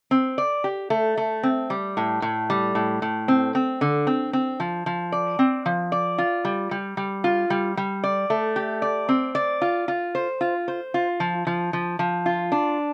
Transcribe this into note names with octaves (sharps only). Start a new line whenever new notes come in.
C4
D5
G4
A3
A3
C4
G3
A2
A2
G3
A2
A2
C4
C4
D3
C4
C4
F3
F3
D5
C4
F3
D5
F4
G3
G3
G3
F4
G3
G3
D5
A3
G4
D5
C4
D5
F4
F4
C5
F4
C5
F4
F3
F3
F3
F3
F4
D4